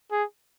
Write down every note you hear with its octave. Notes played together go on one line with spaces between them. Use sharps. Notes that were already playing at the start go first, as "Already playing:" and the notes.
G#4